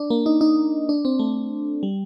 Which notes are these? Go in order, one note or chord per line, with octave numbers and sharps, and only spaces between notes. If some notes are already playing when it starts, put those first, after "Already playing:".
Already playing: D4
A#3
D#4
D#4
D4
C4
A3
G3